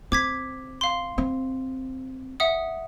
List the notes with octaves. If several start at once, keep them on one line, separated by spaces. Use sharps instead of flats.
C4 D6 G#6 B6
F5 C6
C4
E5 F#5 D#6